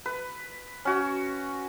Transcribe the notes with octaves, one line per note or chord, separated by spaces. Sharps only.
B4
C#4 F#4